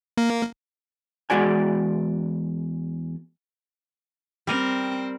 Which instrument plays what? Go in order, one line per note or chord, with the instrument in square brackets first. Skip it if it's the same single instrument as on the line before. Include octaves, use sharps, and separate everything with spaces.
[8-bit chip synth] A#3
[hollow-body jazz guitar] E2 G2 G#3 F#4 D5 G#5
[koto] G3 A#4 [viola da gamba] C4